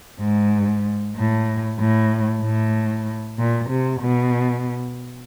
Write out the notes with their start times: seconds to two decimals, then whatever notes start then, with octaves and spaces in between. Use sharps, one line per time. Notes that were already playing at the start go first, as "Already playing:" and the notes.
0.20 G#2
1.16 A2
1.79 A2
2.42 A2
3.38 A#2
3.70 C3
4.01 B2